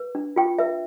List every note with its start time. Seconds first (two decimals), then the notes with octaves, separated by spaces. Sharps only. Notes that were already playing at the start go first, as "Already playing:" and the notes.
Already playing: B4
0.15 D4
0.36 F4 G5
0.59 B4 E5